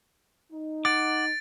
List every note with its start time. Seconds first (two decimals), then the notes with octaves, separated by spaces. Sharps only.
0.52 D#4
0.85 F#5 D6 A6 D7